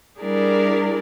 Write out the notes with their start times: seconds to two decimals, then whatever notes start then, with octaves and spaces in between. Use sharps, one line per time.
0.19 G3 D4 E4 G#4 A#4 D5